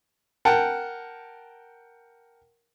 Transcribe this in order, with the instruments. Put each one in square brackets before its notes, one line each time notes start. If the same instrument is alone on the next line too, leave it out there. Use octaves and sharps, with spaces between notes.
[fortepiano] A#4 F#5 G5 A5